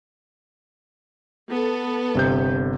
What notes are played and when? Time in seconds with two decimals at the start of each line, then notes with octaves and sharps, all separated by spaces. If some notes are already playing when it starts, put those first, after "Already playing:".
1.49 B3 A4
2.15 G1 C3 G6